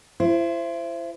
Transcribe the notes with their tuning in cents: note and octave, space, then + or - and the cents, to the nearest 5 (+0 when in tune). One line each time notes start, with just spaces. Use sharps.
E4 +35 C5 +0